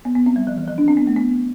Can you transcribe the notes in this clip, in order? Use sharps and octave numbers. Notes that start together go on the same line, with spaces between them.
B3
B3
C4
G3
F3
E3
F3
D4
C4
B3
A3
B3